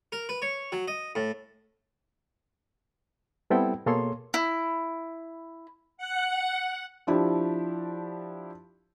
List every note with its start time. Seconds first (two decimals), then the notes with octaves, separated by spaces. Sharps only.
0.12 A#4
0.29 B4
0.42 C#5
0.72 F#3
0.88 D#5
1.15 A2
3.50 G3 B3 C4 E4 A4 G5
3.86 B2 A#3 G#4 A4 C#5 C6
4.34 E4
5.97 F#5
7.07 F3 D4 E4 G4